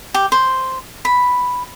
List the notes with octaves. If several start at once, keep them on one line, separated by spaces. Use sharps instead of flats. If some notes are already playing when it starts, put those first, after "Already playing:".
G4
C5
B5